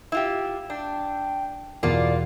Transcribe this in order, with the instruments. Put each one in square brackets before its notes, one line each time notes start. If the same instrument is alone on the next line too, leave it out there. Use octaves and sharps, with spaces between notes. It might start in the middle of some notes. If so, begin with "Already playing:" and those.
[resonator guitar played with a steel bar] E4 F4 G4
[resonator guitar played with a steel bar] D4 [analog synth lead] G5
[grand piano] E2 B2 [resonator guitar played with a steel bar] A#3 F4 [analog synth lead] D5